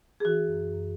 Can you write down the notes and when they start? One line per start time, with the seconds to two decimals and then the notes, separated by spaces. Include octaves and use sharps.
0.20 G#4
0.25 E3 F#4
0.47 F#2
0.68 F#2